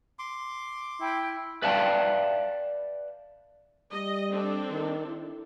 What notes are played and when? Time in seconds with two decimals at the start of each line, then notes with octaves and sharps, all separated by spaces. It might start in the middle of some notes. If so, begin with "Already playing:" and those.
0.19 C6 D6
1.01 E4 G5
1.62 B4 D5 E5 F5 G5 A5
3.93 G3 D#5
4.32 C4 D4 A4
4.71 D#3
5.08 E4